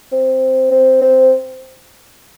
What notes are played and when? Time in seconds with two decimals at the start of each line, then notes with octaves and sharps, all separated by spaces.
0.12 C4
0.71 C4
1.01 C4